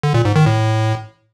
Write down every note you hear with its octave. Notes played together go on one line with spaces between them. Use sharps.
D3
A#2
G#2
D#3
A2